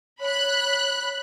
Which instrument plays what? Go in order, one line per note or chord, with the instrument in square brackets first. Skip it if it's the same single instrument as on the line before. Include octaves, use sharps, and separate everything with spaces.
[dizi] C#5 [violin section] B5 F#6